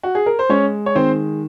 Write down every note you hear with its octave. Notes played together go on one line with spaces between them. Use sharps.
F#4
G#4
A#4
C5
G#3 C#4 C#5
C#5
D#3 C4 C5